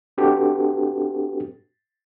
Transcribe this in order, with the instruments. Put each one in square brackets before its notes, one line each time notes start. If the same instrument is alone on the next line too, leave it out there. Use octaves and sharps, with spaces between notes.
[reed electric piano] C4 D4 F#4 G4 A4 B4